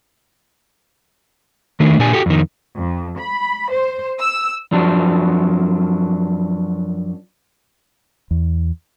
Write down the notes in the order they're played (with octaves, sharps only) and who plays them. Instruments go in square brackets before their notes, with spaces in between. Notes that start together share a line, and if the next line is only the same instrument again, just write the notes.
[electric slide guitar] D#3 A3 D4
A#2 D4 G4 G#5
F#4 G4 A4
F2 D#3
[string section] F2
B5
C5
E6
[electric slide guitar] F#2 F3 F#3 D4
[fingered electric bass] E2